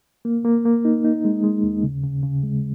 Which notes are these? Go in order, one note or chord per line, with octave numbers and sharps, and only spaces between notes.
A#3
A#3
A#3
D#4
D#4
G#3
G#3
D#2
C#3
C#3
C#3
G#3